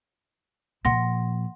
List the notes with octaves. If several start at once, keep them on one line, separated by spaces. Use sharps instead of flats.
A#2 F3 F#5 C6 A#6